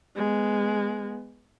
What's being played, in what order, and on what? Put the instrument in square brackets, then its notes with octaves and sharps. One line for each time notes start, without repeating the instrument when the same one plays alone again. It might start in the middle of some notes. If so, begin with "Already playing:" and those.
[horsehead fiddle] G#3 B3